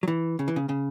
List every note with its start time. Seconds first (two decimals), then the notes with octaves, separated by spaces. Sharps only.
0.03 F#3
0.08 E3
0.39 C#3
0.48 E3
0.56 C#3
0.69 C#3